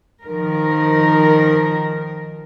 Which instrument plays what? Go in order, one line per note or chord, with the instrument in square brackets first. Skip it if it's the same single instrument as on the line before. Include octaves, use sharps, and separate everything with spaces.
[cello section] D#3 F3 A#4